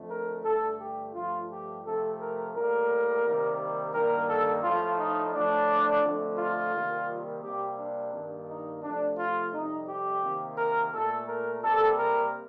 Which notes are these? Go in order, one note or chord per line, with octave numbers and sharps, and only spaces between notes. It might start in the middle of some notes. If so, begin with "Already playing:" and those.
Already playing: F2 D3 A3
A#4
G2 D3 A3 A4
G4
G2 F3 A3 F4
G4
C3 F3 A3 A4
A#4
A2 G3 A#3 A#4
C3 D#3 G3 A#3
G2 D#3 G3 A#3 A#4
A4
A2 F3 A3 F4
D#4
A2 F3 A3 D4
F2 D3 A3
F4
C3 D#3 G3 A#3
C3 G3 A#3 G4
D4
G2 D#3 A#3
D#4
C3 F3 A3 D4
F4
F2 C3 G3 D#4
G4
C3 D#3 A#3
A#4
A#2 A3 A4
A#4
C3 G3 A#3 A4
A#4